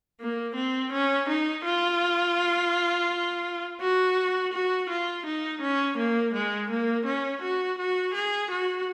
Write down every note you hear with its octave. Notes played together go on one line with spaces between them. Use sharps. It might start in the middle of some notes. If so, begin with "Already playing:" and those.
A#3
C4
C#4
D#4
F4
F#4
F#4
F4
D#4
C#4
A#3
G#3
A#3
C#4
F#4
F#4
G#4
F#4